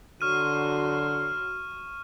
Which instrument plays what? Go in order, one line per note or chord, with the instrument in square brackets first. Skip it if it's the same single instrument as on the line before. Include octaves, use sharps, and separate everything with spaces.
[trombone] D3 [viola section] F#3 F#4 C6 [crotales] C#6 F6 D#7